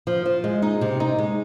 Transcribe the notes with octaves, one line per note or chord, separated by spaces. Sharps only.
F3
F3
G#3
D#4
C3
D#4
G#3